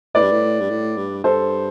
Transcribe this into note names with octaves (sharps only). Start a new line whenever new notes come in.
A2 B4 D5
G2
A2
G2
A2
G2
G2 A4 C5